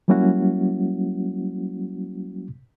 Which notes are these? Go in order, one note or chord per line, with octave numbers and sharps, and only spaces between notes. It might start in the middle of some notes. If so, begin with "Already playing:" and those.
F#3 G3 A#3 C#4 E4 F#4